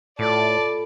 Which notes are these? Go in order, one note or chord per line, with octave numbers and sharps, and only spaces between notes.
A2 F4 A4 D5 A5 B5